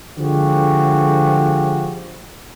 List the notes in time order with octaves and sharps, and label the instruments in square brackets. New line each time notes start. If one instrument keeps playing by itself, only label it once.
[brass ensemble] D3 F3 G#3 F#4 G4